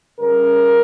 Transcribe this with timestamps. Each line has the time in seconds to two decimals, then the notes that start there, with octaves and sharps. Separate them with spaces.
0.19 C#3 G3 C#4 A#4